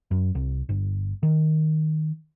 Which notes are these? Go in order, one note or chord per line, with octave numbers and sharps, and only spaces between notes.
F#2
C2
G1
D#3